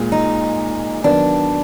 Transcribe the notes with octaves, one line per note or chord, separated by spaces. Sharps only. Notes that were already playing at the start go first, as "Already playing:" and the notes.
Already playing: A#2 G#3
D#4
D#3 F#3 B3 D4